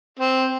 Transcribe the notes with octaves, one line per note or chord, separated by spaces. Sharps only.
C4